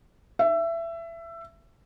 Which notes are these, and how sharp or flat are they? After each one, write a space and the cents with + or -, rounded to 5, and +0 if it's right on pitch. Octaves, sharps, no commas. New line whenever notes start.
E5 +20